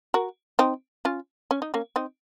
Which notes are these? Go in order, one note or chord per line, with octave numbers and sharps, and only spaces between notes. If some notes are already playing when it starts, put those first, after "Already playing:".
F#4 A#4
C4 D#4
C#4 F4
C#4
D#4
A#3 C#4
C4 D#4